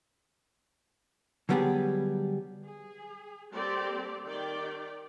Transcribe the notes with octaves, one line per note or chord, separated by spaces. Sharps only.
D3 F#3 G3 B3 G4 G#4
G#4
G3 A#3 C4 G4 A4 D5
D#3 G4 D5 G5